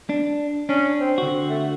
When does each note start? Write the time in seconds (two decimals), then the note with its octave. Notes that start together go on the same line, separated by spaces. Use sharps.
0.09 D4
0.69 C#4 D4
1.01 C4
1.18 D3 F#4
1.49 A3